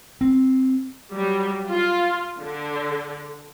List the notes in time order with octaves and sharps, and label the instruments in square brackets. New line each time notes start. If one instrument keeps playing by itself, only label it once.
[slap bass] C4
[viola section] F#3 G3
F4
D3